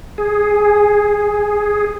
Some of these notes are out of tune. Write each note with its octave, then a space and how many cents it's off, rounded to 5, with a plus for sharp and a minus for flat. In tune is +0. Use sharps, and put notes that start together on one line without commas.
G#4 +0